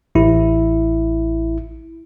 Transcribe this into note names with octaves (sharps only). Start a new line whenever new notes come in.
A1 E4